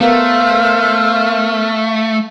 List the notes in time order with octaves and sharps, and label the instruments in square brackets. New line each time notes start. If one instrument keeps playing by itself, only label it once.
[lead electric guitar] A3 [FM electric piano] B3 A#4 [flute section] C5 E6 F6 [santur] F5